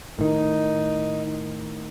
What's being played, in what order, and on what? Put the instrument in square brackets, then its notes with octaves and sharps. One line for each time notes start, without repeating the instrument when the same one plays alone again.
[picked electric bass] A2 D#3 [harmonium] D#4